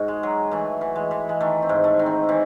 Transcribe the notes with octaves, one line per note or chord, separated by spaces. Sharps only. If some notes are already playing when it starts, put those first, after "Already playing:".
Already playing: G#2 F#4
G#3
F#3
E3 A3
E3
G#3
E3
G#3
D#3 A3
C4
G#2
A3
D#3
C4
E3 C4